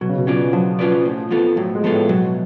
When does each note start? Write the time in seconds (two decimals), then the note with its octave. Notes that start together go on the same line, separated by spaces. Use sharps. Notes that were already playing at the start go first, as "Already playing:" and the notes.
0.01 B2 F#3
0.09 C#3
0.18 B2
0.27 C#4 F4 B4 D5
0.53 F3 F#3
0.79 C#4 F4 B4 D5
1.05 A2
1.31 F3 B3 F4 A4
1.57 A2 F#3
1.75 G#3
1.84 F3 B3 F4 A4
1.92 A2
2.09 B2 F#3